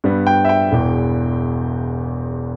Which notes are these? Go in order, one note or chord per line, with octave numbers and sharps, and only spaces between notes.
G2 G3 B3
G5
E5
G5
E1 E2 E3